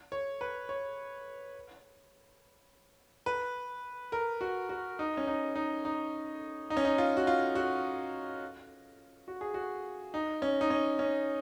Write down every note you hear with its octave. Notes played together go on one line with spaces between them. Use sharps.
C#5
B4
C#5
B4
A#4
F#4
F#4
D#4
C#4
D#4
D#4
D#4
D#4
C#4
D#4
F4
F#4
F4
F#4
F#4
G#4
F#4
D#4
C#4
D#4
C#4
C#4